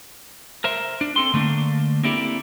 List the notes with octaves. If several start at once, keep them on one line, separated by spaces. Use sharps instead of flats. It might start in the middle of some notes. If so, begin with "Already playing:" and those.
A#4 C5 E5
D4
C4 A4 C6
D3 A3 A#3 D4
A#3 C4 D4 E4 G4 A4